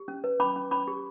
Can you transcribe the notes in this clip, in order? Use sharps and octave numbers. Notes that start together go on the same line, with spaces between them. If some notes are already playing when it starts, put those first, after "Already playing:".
Already playing: G4
C#4
B4
C#4 B5 D6
C#4
C#4 B5 D6
G4